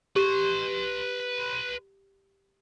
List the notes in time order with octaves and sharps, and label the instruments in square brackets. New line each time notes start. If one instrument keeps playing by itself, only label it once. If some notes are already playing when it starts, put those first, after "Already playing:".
[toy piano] G4 [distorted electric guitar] B4 C6